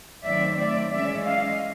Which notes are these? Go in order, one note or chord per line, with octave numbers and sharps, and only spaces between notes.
D#3 F#3 A3 C4 D5 E5
D5 E5
E3 G#3 C#4 D5 E5
D#5 F5